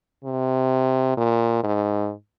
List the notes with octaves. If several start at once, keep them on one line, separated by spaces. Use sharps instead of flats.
C3
A#2
G#2